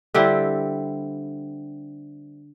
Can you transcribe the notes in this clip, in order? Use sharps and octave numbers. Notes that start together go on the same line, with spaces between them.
D3 G3 C4 E4